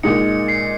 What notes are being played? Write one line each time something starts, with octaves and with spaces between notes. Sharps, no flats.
A#2 G#3 D#4 C#7
C7